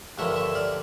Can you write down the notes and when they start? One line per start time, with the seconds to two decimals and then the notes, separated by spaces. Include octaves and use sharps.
0.18 G2 D3 F3 A#3 C#5 E5
0.36 C#5 E5
0.55 D5 F5